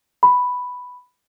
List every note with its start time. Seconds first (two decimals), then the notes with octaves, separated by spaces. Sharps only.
0.23 B5